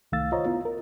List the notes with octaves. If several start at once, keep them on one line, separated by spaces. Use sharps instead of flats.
C2 D#3 A3 F5 E6 A6
F4 C5 C#5 D#5 A#5
B3 E4 F4
A#4